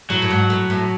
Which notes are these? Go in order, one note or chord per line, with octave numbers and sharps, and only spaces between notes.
A2 F#3
A2
G#2
A2
A2